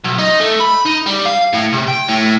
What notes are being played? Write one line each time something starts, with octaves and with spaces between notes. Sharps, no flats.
B1
D#4
A3
B5
D#4
G3
F5
A2
C3
G5
A2